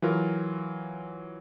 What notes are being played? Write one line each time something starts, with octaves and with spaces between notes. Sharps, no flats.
E3 F#3 F4 A#4